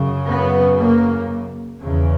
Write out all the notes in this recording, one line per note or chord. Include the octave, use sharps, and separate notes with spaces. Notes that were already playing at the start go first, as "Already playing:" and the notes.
Already playing: F#2 C#3
B3
A#3
E2 C#3